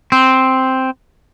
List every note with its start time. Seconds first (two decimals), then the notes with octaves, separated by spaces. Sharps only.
0.12 C4